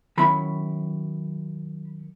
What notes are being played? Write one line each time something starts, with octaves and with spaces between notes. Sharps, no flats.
D#3 F#3 C#4 E4 B5